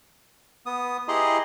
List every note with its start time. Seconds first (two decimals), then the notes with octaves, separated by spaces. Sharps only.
0.66 B3 D#6
1.08 E4 G4 G#4 D#5 A#5 C6